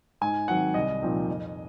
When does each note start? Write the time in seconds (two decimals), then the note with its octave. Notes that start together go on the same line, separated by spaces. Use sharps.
0.21 G#2 G#5
0.48 D#3 F#3 C4 F#5
0.74 C2 D#5
1.01 A#2 F3 C4 D#4
1.27 F2